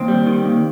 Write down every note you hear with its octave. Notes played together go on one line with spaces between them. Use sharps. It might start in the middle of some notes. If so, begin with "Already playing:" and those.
Already playing: D#2 C4
G3
D#3
D#2